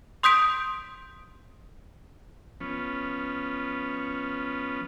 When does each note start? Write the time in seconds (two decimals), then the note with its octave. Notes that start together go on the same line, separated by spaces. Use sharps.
0.23 C6 D#6 G6 B6 D7
2.60 F3 B3 C#4